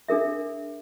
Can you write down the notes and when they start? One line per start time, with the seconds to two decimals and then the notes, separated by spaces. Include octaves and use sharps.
0.08 D4 G#4 A#4 E5